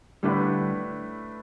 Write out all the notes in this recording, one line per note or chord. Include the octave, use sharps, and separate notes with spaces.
A2 D3 G3 A3 D4 B4